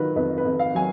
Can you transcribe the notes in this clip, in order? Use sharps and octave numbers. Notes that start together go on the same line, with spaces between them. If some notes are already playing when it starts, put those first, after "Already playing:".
Already playing: D#3 F#3 F4 A#4 B4
F2 B4
B4
F2
F5
F#3 G#5